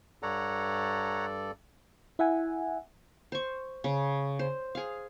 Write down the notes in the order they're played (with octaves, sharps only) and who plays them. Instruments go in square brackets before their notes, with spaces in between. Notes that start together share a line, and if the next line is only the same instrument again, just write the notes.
[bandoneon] G2 A4 D5 [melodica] C#5 F#5 A#5
[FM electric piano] E4 E5 F#5 G#5
[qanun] C5 C#6
C#3
C5
G#4 F5